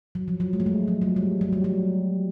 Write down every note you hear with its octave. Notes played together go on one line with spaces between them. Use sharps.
F#3
F3
F#3
G#3
A3
G#3
F3
F#3
G3
F#3
G3
F#3